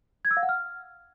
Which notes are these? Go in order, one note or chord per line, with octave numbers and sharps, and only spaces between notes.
G#6
E6
F5
F#5
F6